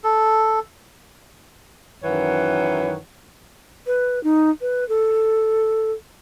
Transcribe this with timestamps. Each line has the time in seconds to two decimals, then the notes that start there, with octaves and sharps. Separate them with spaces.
0.04 A4
2.03 F#2 D#3 E3 B4 C#5 F#5
3.86 B4
4.23 D#4
4.61 B4
4.89 A4